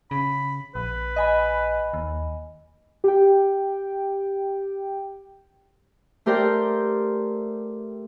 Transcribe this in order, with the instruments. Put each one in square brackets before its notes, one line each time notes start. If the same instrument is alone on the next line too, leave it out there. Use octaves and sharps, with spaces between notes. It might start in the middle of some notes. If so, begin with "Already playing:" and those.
[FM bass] C#3 [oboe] B5
[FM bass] A#1 [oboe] B4
[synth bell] D#5 G#5 B5
[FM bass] D#2
[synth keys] G4 G5
[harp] A3 G4 A#4 C5 D5 G5